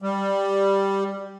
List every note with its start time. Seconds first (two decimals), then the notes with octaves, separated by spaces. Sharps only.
0.02 G3